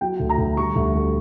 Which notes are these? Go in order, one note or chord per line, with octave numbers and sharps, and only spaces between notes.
F#3 G5
D2
A#5
D2
G3 C#6
D2
D2